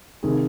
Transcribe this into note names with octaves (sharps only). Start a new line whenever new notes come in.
C3 D#3 G#4